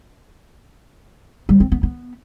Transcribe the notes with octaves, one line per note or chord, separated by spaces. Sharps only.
G3
C4
B3
B3